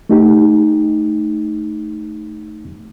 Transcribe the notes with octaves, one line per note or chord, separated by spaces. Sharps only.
A3 D#4 G4